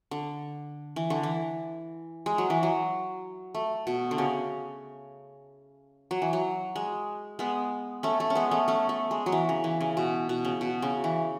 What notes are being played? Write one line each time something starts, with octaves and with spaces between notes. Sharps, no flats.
D3
E3
D3
E3
G#3
F#3
E3
F#3
A3
B2
D3
C#3
F#3
E3
F#3
G#3
G#3 B3
A3 C#4
A3
C#4
G#3 B3
A3 C#4
A3 C#4
A3
G#3
F#3
E3
C#3
E3
C#3
B2
B2
C#3
B2
C#3
E3